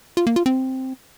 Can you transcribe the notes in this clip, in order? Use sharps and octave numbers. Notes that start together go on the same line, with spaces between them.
F4
A#3
F4
C4